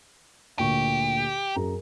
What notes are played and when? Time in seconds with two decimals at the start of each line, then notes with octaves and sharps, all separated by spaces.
0.59 D2 A#2 G4 C#6
1.55 F#2 G#4 A#5